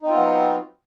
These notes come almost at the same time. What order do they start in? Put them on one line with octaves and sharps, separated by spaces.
D#4 C4 F4 B3 F#3